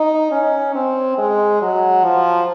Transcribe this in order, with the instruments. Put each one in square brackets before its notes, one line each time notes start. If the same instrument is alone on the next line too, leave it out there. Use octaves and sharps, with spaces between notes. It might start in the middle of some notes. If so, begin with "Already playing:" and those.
Already playing: [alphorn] D#4
C#4
C4
G#3
F#3
F3